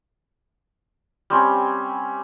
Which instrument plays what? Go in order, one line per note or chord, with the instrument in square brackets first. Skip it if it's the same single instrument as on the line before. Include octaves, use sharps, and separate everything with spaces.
[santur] G3 C4 C#4 G4